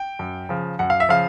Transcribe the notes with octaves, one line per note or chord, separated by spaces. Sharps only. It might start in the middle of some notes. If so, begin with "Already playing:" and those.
Already playing: G5
F#2
C#3 F3
F#2 F#5
F5
E5
C#3 F3 F5